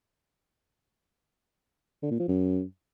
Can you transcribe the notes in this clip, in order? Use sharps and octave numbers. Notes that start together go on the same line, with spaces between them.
D3
A#2
F3
F#2